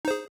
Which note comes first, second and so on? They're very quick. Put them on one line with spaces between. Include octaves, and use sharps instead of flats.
D#4 C5 G#4